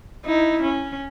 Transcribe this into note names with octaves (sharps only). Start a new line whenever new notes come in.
D#4 E4
C#4